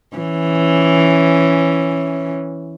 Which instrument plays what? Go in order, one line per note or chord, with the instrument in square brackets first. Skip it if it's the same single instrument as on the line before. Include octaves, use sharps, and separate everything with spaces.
[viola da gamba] E3 C#4